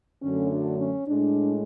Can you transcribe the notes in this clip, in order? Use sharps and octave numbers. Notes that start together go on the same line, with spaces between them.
F#2 D3 F#3 A3 C#4
D4
C#4
A2 G#3 D4